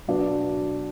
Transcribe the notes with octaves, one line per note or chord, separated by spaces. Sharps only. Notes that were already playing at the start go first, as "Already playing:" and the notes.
B2 F#3 D4 B4